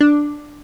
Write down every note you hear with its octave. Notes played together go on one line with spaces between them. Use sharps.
D4